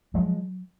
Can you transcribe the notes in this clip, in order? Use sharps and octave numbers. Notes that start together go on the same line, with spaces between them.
F3 F#3 G#3